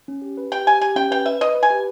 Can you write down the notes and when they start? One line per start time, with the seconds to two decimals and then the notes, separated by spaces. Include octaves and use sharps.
0.08 C#4
0.22 G4
0.37 B4
0.52 G4 G5
0.67 G4 G#5
0.81 G4 G#5
0.96 C#4 G5
1.11 B4 G5
1.25 B4 E5
1.41 B4 D#5
1.55 B4
1.63 G#5
1.70 G4